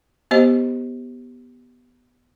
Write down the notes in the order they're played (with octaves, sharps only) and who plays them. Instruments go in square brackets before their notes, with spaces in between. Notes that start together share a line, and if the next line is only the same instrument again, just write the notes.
[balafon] B3 G4 C5 D#5